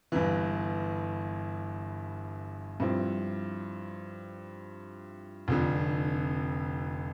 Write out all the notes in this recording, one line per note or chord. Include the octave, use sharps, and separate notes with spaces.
G1 G2 E3
G2 F3 C4 E4
F1 F2 D3